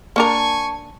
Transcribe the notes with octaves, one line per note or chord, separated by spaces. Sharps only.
A#3 D4 A#4 G#5 A5 C#6